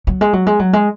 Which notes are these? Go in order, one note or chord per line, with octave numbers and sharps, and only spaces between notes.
F#3
G#3
F#3
G#3
F#3
G#3